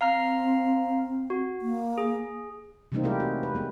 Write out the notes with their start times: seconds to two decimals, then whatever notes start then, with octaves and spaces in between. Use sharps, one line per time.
0.01 C4 F5 A#5 F6
1.30 F#4
1.62 A#3
1.98 G#4
2.92 C3 E3 G3 A#3 C4 D#4
3.04 G#3 A3 E4 G4 A#4
3.20 F#4
3.43 B4
3.55 G#3 B3